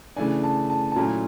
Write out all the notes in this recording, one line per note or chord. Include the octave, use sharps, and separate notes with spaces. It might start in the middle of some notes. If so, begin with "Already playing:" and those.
C#3 E3 A3 D4 G#5
A5
A5
A5
A#2 F#3 A3 C#4 E4 A#5